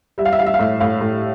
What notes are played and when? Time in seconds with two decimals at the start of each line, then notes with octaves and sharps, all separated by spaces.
0.18 G3 E5
0.25 F5
0.33 E5
0.39 G3 F5
0.46 E5
0.54 F5
0.59 A2 E5
0.80 A2 F5
1.01 A2